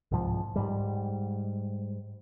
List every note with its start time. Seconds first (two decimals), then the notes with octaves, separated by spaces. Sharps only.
0.11 C2 G#2 F3
0.56 G#2 G3